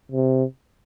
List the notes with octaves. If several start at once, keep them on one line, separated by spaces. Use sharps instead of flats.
C3